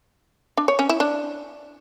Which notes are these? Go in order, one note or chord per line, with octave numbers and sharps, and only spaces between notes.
D4
C#5
C#4
E4
D4